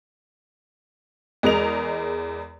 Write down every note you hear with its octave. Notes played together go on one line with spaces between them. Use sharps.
E2 G#3 A#4 D#5 F7